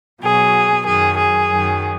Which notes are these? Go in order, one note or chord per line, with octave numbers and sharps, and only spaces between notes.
B2 F#3 G#4
F#2 D#3 F#3 G#4
G#4
F#2 D#3 F#3